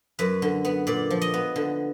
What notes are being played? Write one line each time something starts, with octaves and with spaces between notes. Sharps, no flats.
F#2 B4
D3
B3
A#2 D5
F3
D#5
B3
D3